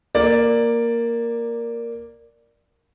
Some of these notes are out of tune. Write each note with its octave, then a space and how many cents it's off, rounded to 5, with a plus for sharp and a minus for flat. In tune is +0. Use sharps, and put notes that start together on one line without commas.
A#3 +0 D5 +0